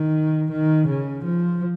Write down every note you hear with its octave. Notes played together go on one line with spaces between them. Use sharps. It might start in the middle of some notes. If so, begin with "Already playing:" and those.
Already playing: D#3
D#3
C#3
F3